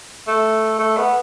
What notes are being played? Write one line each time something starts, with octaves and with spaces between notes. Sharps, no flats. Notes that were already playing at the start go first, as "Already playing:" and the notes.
A3
A3
B3